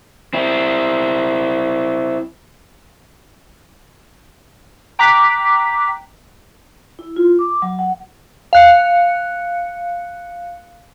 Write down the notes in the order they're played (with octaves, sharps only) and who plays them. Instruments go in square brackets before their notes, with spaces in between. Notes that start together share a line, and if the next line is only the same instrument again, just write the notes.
[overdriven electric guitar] C4 E4
[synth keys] G5 A#5 D6 F#6 B6
[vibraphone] E4
F4
D6
F#3
F#5
[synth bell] F5 F#6 C#7